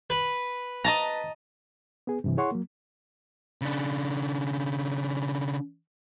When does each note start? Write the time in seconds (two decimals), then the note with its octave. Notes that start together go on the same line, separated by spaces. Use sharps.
0.10 B4
0.84 D#5 A5 A#5
2.07 B3 G#4
2.24 G2 C3 E3
2.37 E4 G#4 C#5 F#5 C6 C#6
2.52 F#3 A#3
3.61 C#3 D4